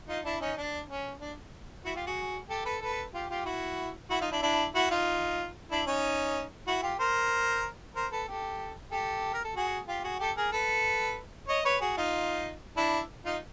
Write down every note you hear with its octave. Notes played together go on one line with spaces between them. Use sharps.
D#4 F4
D4 E4
C#4 D#4
D4
C#4
D4
E4 F#4
F4 G4
F#4 G#4
G4 A4
A4 B4
A4 B4
F4 G4
F4 G4
E4 F#4
E4 F#4
D#4 F4
D4 E4
D4 E4
E4 F#4
D#4 F4
D4 E4
C#4 D#4
E4 F#4
F4 G4
A#4 C5
A#4 C5
A4 B4
G4 A4
G4 A4
A#4
A4
F#4 G#4
F4 G4
F#4 G#4
G4 A4
G#4 A#4
A4 B4
C#5 D#5
B4 C#5
F#4 G#4
D#4 F4
D4 E4
D#4 F4